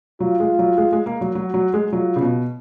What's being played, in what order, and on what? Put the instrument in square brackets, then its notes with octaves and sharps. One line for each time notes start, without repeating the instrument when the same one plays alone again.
[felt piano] F#3 [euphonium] F4
[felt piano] G#3
F#3
G#3
G#3
A#3
F#3
[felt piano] F#3 [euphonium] F#4
[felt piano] F#3
G#3
[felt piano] F#3 [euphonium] F4
[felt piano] C#3
B2